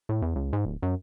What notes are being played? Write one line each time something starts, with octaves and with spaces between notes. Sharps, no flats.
A2
E2
C#2
G#2
D1
F#2